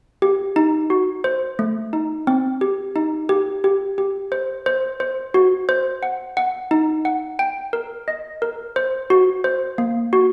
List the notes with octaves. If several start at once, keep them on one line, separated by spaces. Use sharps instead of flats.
G4
D#4
F#4
C5
A3
D#4
C4
G4
D#4
G4
G4
G4
C5
C5
C5
F#4
C5
F#5
F#5
D#4
F#5
G5
A#4
D#5
A#4
C5
F#4
C5
A#3
F#4